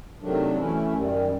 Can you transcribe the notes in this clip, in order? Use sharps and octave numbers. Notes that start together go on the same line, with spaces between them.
C3 D#3 F#3 A3 D4
E3 A3 C#4 E4
F#2 D#3 G3